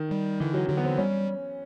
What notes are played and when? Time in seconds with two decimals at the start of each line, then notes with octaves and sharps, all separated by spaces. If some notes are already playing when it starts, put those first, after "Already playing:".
Already playing: D#3
0.11 G3
0.40 D3 E3
0.54 F#3
0.69 D3 F#3
0.77 B3
0.84 C4
0.98 G3 C#4